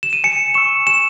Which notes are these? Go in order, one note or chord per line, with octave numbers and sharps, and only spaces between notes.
E7
D#7
G#5 C#7
C#6 E6 E7
G#5 E7